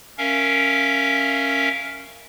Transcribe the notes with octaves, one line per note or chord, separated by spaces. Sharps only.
C#4 A#4 E5 F5